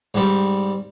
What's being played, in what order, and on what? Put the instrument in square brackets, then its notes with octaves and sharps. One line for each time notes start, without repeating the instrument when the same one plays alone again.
[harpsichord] G#2 G3 C4